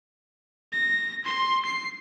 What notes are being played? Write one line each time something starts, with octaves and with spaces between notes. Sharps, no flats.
A#6
C6
C7